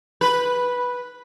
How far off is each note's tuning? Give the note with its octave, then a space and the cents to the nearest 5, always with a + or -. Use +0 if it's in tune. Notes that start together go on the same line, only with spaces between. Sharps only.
B4 -5